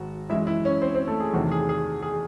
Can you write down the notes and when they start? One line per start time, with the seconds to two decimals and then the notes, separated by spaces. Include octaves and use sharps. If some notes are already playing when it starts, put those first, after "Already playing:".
Already playing: G#1 F#4
0.30 F#2 E3 G#3 E4 E5
0.47 E4 E5
0.65 C#4 C#5
0.82 C4 C5
0.94 C4 C5
1.07 A3 A4
1.20 G#4
1.34 E2 C3 D#3 A3 F#4
1.51 G#4
1.69 G#4
2.03 G#4